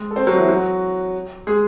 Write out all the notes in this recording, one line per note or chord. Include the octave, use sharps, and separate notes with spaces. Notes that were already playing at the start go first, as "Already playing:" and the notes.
Already playing: G#3
A4
C4 C5
F#3 F#4
E3 E4
F#3 F#4
G#3 G#4